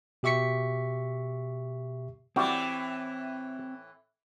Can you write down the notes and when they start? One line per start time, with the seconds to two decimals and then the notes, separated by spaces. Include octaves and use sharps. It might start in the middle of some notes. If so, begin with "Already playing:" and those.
0.23 B2 G4 E5 C#6 B6 C#7
2.36 A2 E3 G3 C4 E4 F#4 G5 D6